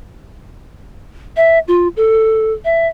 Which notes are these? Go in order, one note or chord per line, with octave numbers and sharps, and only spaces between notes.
E5
F4
A4
E5